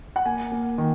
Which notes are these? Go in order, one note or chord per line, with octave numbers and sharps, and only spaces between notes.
F#5
A#3 G#5
A#3
D#3